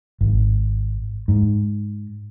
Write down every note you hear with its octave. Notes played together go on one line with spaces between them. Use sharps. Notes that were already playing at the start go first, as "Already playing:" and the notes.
G#1
G#2